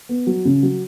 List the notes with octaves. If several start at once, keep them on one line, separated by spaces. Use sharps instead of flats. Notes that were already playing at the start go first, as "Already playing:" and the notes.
B3
F#3
C#3
F#3